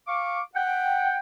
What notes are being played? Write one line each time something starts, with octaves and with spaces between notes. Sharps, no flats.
F5 C#6 D6
F#5 G5